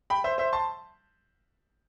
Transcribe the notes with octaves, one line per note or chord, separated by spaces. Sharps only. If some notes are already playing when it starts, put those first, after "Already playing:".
G5 B5
C5 E5
C5 E5
A5 C6